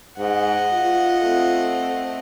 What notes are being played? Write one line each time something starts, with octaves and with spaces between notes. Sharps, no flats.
G#2 D#5 F#5
F4
A3 C4